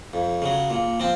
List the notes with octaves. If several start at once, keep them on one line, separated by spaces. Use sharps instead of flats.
F2
C#3 F#3
A#2
F3 C4